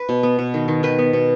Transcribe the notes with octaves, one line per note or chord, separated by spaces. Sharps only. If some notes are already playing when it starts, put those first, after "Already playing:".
Already playing: B4
B2
B3
B2
D#3
D#3
D#3 B4
B3
B2